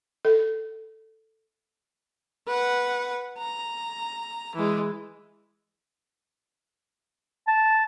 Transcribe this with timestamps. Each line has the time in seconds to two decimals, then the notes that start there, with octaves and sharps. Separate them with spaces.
0.25 A4
2.48 B4 F#5
3.38 A#5
4.55 E3 G#3
7.47 A5